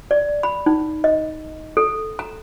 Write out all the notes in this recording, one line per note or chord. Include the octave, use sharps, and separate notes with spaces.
D5
B5
D#4
D#5
A4
A#5